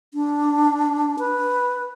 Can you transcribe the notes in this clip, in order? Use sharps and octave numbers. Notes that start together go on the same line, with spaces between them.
D4
B4